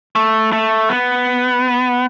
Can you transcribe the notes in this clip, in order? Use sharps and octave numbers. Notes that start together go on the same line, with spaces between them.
A3
A3
B3